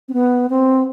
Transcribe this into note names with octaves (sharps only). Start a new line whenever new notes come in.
C4
B3
C4